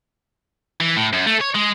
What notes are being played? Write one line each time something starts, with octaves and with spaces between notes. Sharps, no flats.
E3
A2
F#2
A3
C#5
G#3